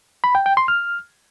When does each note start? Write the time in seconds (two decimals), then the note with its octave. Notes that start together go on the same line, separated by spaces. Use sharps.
0.24 B5
0.35 G5
0.46 G5
0.57 C6
0.68 F6